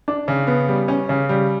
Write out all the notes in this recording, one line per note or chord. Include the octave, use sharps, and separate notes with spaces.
D4
C#3
B3
G3
C#4
C#3
G3